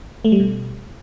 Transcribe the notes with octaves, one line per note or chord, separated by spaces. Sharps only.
A3
G3
B2